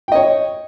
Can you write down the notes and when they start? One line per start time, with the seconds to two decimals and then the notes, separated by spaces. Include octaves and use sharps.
0.08 G5
0.12 D#5
0.15 C#5